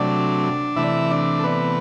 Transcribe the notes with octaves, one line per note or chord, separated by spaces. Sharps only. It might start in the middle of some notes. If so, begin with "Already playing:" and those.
Already playing: C3 F#3 A3 D4 D5
C3 E3 A3 E4 E5
D4 D5
A4
B3 B4